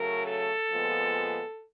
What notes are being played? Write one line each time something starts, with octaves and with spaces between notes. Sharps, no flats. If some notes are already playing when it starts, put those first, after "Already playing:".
Already playing: C#3 F#3 A3 A#4
A4
A#2 F3 G#3 B3